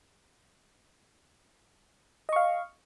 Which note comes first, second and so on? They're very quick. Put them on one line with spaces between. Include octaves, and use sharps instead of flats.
D#5 C#6 F5